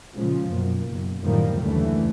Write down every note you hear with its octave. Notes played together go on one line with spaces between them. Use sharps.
A#2 C#3 F3 G#3
F#2 B2 A#3
F#1
F#2 A2 D#3 F3 G3 A#3
F#1 D#2 D3 E3 A3